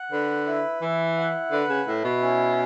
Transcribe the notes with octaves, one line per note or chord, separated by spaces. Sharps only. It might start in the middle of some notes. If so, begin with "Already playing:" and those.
Already playing: F#5
D3 B4
E4
E3 E4
F#5
D3 B4
C#3
A2 E4
B2
C#4